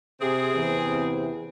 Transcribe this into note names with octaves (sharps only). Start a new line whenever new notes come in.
C3 C4 G#4
E2 C3 E3